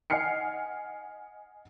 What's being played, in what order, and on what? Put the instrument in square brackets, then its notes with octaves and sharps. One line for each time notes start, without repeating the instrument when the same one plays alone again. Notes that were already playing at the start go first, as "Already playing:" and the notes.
[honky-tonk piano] D#5 F#5 G#5 F6 C7 C#7